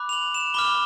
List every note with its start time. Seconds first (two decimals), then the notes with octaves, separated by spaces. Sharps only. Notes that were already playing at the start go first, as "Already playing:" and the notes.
Already playing: B5 D6 F#6
0.09 F7
0.13 F#7
0.34 E7
0.54 B5 D6 F6 G7